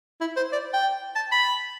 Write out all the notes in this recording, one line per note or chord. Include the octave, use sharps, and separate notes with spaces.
E4
C5
D5
G5
A5
B5